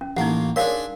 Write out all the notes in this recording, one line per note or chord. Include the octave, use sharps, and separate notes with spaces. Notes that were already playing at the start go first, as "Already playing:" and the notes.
C#4
A1 A#3 D#4 F#5
D4 G#4 A#4 C#5 F5 C6